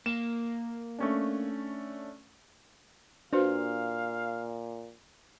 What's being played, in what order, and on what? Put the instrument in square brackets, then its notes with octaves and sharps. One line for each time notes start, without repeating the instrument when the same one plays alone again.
[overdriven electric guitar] A#3 [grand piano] E7
[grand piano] A3 C#4 D4
[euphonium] A#2 [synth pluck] D4 [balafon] F#4 B4 C5 [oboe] F5